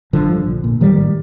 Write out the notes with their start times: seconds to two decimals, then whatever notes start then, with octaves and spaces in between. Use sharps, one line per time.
0.13 G1 D3 F3
0.30 G2 D3
0.47 A#1
0.64 A#2
0.80 A1 D#3 G3
0.98 A2